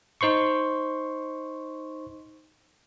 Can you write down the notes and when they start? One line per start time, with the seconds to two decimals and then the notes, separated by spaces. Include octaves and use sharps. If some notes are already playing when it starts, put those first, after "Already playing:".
0.21 D#4 C5 C6 C#6